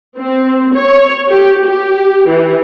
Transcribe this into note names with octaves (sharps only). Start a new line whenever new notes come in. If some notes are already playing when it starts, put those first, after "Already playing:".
C4
C#5
G4
G4
E3